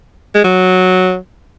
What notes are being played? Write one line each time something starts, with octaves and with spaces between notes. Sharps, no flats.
G#3
F#3